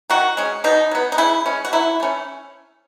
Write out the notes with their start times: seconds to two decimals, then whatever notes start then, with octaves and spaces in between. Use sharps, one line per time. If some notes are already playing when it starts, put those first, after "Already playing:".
0.10 D#3 F#4
0.37 G#3 C#4
0.64 B2 D#4
0.91 F#3 B3
1.12 D#4
1.18 C#3 E4
1.46 G#3 C#4
1.65 F#4
1.73 F#3 E4
2.00 A3 C#4